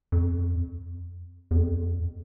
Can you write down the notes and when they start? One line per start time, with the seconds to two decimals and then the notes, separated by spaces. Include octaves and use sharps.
0.12 F2
1.51 E2
1.56 F2